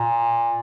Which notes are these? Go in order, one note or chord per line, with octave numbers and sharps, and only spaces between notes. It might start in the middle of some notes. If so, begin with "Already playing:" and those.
Already playing: A#2